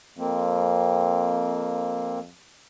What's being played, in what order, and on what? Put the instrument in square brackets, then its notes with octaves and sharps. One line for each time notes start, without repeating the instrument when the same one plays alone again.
[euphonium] F2 [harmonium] A#3 C4